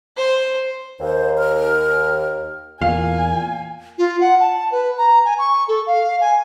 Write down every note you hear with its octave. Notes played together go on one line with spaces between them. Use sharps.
C5
D#2 C5
F6
E2 A#2 F5 G#5
F4
F#5
A5
B4
A#5
G#5
C#6
A4
F5
G#5